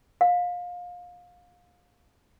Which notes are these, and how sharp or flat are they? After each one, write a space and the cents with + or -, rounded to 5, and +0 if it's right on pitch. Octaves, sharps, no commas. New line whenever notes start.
F5 +25